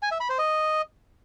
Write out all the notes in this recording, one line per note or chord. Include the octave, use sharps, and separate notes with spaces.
G#5
E5
B5
C5
D#5